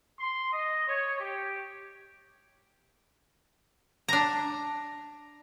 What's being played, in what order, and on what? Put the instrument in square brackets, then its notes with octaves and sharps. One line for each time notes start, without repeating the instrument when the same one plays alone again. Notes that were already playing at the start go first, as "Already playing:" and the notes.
[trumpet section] C6
D#5
C#5
G4
[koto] D4 A#5